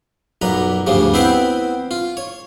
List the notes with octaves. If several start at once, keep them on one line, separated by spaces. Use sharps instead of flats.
B1 F#2 A#2 B4 A#5
D2 G2 C#3 F3 G3
B3 C4 E4 B4 C5 G5
F4
C#5